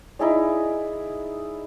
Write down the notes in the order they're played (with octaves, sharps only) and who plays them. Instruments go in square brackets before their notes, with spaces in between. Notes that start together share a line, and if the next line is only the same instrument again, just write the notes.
[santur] D#4 E4 G#4 D5